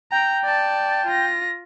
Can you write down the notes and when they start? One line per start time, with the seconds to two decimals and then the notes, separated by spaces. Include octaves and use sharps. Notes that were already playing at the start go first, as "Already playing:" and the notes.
0.12 G5 A#5
0.44 D5 A5
1.07 F4 A#6